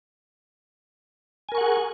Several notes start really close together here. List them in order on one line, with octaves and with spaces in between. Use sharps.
G#5 A#4 C#6 F#5 G#4